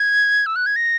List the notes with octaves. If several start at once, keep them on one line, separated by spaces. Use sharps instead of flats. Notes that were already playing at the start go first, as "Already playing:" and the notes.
Already playing: G#6
E6
F#6
G#6
A#6